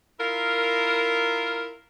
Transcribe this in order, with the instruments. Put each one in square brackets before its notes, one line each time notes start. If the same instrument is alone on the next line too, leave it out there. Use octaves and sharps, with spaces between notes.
[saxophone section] E4 F4 A#4